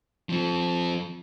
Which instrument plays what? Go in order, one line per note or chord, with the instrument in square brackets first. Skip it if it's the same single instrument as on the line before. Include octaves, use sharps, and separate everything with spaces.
[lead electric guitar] F3 C4